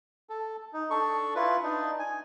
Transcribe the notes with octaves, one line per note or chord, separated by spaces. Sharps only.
A4
D#4
D4 A4 C#6
E4 F4 B4
D4 D#4
G#5